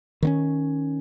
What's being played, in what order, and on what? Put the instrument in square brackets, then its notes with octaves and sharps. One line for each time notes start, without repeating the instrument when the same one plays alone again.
[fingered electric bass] D#3 C4 C#4